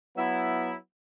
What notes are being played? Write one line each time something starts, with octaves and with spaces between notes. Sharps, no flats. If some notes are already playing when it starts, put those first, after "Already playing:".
F#3 B3 E4